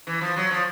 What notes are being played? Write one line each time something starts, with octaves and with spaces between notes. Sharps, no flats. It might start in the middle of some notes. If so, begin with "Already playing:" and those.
E3
F3
F#3
F3